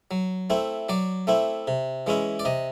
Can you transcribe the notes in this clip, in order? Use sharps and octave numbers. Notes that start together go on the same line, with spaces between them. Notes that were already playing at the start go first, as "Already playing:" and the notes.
F#3
A3 C4 E4
F#3 D5
A3 C4 E4
C3
E3 G#3 C#4 E4
D5
C3 D#5